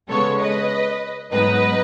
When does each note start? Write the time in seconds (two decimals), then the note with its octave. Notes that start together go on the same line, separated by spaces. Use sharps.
0.08 C#3 G#3 B3 A4 C#5
0.40 B4 D#5
1.31 G#2 F#3 B3 D#4 B4 D#5